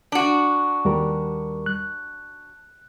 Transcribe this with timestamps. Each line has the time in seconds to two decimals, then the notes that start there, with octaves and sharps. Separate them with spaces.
0.12 D4 F#4
0.85 D#2 G3 A#4
1.66 F#6